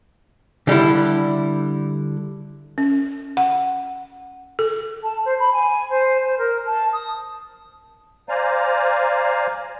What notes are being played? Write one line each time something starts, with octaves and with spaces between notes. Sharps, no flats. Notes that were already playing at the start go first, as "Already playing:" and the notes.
D3 G3 D4 E4
C#4
F#5
A4
A5
C5
B5
G#5
C5
C5
A#4
A5
D#6
C5 D5 F5 G#5 A#5